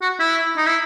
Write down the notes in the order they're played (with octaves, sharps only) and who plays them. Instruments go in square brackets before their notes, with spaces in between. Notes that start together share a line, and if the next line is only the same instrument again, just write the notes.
[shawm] F#4
E4
D#4
E4